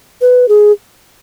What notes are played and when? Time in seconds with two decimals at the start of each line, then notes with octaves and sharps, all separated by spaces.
0.21 B4
0.48 G#4